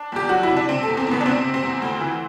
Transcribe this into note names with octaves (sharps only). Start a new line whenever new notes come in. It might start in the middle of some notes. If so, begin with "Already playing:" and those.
Already playing: D4
E2 G4
F#3 F#4
E4
C3
D4
C3 C4
E2 A4
C4
E2 B3
D4
C3 C4
C3
C4
E2
D2
E3